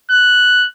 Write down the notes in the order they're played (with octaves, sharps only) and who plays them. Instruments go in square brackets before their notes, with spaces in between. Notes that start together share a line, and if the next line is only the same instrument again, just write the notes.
[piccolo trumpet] F#6